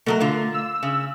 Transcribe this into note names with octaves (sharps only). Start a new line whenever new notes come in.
B2 F#3 A3 A#4
D3 F4
E6
C#3